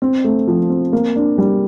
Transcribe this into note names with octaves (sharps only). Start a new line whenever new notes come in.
C4
A3
F3
C4
A#3
D4
G3